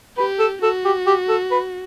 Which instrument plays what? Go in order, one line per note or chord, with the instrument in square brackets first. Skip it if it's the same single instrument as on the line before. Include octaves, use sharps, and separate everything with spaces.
[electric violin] G4 [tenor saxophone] B4
[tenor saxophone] A4
[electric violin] F#4 [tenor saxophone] A4
[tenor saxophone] G4
G4
A4
B4